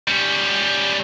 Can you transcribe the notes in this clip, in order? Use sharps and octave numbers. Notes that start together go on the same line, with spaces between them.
G3 C#4